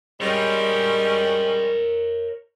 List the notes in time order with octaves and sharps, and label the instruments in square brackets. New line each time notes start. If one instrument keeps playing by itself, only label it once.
[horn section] G3 G#3 C#4 [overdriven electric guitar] A#4 C#5